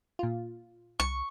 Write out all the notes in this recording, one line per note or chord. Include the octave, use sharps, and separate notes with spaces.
A#2 F4
C2 C#6